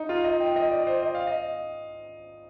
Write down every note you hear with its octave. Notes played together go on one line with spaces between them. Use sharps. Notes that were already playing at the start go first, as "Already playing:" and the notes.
Already playing: D#4
F4
D#5
G5
D#5
D5
C5
D#5
F5
D#5